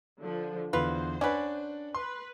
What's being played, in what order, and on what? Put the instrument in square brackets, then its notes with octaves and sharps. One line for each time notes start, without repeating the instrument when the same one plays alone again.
[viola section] D3 F3
[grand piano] E2 D3 [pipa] F4 B4 [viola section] C5
[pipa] C#4 B4 [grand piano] D4 D5 F#5
[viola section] B4 [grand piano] C6